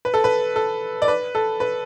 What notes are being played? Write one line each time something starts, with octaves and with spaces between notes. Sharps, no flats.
B4
A4
B4
A4
D5
B4
A4
B4